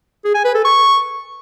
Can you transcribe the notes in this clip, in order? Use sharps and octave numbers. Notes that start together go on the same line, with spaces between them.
G#4
G#5
B4
A4
C#6